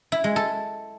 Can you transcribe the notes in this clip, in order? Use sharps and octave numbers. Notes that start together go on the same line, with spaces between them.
E4
G#3
A4